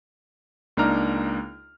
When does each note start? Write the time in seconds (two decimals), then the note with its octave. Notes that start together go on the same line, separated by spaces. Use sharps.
0.77 C#2 A#3 D4 D#4 A#5 F6